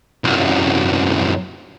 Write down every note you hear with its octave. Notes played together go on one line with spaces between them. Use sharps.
C2 F#2